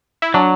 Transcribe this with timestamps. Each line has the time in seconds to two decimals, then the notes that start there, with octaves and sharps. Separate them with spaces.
0.22 E4
0.34 F#3 D4